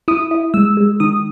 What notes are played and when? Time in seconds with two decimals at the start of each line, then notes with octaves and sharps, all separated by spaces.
0.08 E4 D#6
0.31 E4
0.54 G#3 E6
0.77 G#3
1.00 D#3 D#6